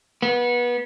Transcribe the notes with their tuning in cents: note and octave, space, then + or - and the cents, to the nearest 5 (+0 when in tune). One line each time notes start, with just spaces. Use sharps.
B3 -25